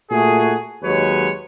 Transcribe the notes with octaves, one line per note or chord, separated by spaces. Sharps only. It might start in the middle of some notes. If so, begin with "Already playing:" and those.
A#2 A3 F#4 G#4
D#2 F#3 G#3 B4 C#5